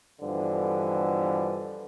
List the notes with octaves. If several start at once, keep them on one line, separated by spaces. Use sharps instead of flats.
G2 B2 D3 E3 F3